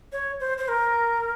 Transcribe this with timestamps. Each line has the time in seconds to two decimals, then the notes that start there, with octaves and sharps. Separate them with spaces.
0.12 C#5
0.40 C5
0.58 C5
0.68 A#4